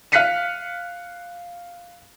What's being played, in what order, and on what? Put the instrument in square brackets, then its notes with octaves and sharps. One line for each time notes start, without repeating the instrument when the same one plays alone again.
[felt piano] F5 F6 F#6 B6 C#7 D#7